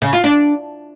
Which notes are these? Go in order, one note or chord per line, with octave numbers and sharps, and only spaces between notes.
C#3
F4
D4